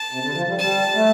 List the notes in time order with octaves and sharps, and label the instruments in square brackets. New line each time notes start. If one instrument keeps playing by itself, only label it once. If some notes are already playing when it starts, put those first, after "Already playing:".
Already playing: [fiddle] A5
[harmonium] C3
D3
F3
G3
[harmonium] G3 [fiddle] A5
[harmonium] A3